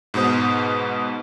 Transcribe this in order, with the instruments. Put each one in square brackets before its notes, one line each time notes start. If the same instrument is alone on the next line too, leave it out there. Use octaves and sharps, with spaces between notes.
[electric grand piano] G#2 B2 B3 C5 D#6